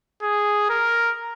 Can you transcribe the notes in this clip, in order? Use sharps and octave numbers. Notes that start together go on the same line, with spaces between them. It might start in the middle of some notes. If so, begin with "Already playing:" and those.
G#4
A#4